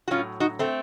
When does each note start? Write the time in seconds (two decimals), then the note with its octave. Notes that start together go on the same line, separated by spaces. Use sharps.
0.08 F#4
0.11 A2 F#3 C#4 F4
0.40 D#4 F#4
0.59 A3 C4